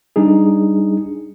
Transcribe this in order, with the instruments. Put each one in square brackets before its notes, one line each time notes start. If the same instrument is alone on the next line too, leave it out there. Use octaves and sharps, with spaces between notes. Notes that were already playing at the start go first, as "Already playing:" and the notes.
[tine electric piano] G3 D4 D#4 G#4